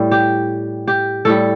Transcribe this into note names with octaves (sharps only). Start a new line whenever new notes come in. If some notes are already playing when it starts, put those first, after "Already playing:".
Already playing: A2 G3
G4
G4
A2 G3 A4